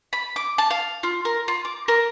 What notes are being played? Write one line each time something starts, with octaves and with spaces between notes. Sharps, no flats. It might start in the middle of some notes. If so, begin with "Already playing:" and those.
B5
D6
A5
F5
F4
A#4
F4
D6
A#4